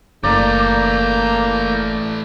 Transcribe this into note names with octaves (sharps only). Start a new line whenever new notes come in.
F#1 E3 A3 A#3 D5 A#5 G6